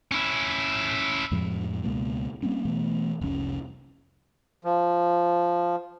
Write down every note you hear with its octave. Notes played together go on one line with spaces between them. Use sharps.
C#4 E4
F2 A2 F3 G#3
C#2 B2 G#3 A#3
G3 A#3 C4 C#4
B2 E3 A3 B3
F1 C2 C#4
F3